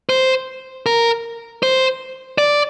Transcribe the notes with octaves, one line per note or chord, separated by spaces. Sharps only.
C5
A#4
C5
D5